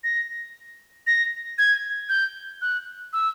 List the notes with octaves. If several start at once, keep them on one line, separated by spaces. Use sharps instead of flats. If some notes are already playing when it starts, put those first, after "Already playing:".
A#6
A#6
G#6
G6
F#6
E6